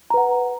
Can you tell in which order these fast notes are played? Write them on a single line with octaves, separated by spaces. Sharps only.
A#5 B4 F#5